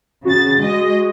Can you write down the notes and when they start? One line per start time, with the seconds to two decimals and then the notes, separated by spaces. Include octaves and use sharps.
0.25 C#3 F#4 A6
0.59 G#3 D#5